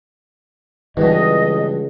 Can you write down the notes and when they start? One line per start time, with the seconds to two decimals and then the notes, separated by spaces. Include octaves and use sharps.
0.97 C#2 G2 B2 E3 D#5